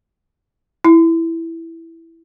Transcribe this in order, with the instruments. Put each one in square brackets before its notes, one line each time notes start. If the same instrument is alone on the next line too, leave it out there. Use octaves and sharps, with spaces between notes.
[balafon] E4